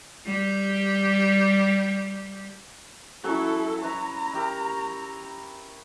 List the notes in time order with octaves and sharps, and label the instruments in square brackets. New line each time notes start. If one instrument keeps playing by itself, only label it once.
[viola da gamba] G3 G4
[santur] F#3 C#4 [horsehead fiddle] E4 A4
[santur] E4 B4 C#5 [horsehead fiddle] A#5
[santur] E4 G4 A#4